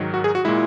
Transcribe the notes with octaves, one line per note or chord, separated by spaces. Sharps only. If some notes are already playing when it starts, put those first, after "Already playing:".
Already playing: G#2 D#3 F#3
F#4
G#4
F#4
A#2 G#3 E4